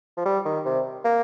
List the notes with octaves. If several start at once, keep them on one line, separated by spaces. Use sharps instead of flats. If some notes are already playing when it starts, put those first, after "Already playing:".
F3
G3
D#3
C3
A#3